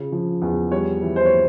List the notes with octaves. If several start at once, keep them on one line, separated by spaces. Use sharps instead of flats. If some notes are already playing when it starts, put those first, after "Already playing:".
Already playing: C#3 F4
F3
E2
G3 C#5
E3
C5
C#5
A#3